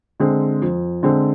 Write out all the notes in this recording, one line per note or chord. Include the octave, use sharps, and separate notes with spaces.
D3 G#3 C4
F2
D3 G#3 C4